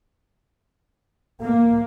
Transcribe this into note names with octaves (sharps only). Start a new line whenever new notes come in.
A#3